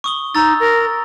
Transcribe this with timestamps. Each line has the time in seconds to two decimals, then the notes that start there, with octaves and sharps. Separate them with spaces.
0.04 C#6 D#6 G7
0.35 D#4 A#5 E6 A6
0.60 A#4